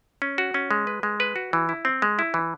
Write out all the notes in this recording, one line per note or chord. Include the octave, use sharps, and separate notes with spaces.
C#4
F#4
C#4
G#3
B4
G#3
B4
F#4
E3
E4
C4
G#3
E4
E3